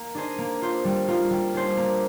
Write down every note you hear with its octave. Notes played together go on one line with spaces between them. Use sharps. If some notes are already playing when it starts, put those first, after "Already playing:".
Already playing: A#3
D4 G#4 C5 D#5
A#3
F4 C5
G3
A#3 F4
G3
D4 G#4 C5
A#3